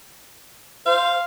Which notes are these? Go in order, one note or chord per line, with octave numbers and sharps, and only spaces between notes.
C5 F5